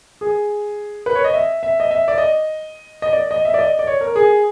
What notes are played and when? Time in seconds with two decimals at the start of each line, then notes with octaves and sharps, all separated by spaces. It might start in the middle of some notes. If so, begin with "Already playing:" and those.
0.21 G#4
1.06 B4
1.15 C#5
1.24 D#5
1.34 E5
1.63 E5
1.80 D#5
1.91 E5
2.08 D5
2.18 D#5
3.02 D#5
3.13 D5
3.31 D#5
3.45 E5
3.54 D5
3.59 D#5
3.79 D5
3.87 C#5
4.01 A#4
4.16 G#4